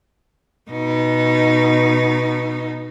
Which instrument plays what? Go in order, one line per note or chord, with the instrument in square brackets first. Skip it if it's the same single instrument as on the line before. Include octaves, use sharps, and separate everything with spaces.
[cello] B2 D#4